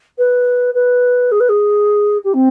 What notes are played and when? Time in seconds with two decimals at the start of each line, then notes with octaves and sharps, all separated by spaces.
0.18 B4
0.74 B4
1.31 G#4
1.40 B4
1.49 G#4
2.24 G4
2.33 C4